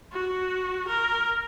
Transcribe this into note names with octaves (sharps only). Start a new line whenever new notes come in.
F#4
A#4